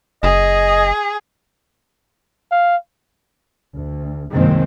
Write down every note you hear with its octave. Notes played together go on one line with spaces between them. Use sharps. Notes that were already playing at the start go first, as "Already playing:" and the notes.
F#1 G#4 D#5
F5
D2
C2 F#2 D#3 G#3 A#3 C4